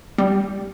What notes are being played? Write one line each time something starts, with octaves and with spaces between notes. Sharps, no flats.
G3